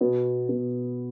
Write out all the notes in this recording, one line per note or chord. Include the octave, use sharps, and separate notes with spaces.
B2 B3 F#4
B2 B3 F#4